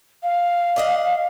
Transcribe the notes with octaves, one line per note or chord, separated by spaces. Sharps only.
F5
D5 D#5 F#5